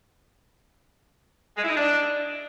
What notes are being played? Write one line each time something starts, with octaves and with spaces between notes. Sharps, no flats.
G#3
E4
D#4
D4